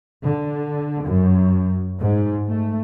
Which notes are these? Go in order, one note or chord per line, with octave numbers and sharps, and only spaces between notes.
D3
F#2
G#2
A3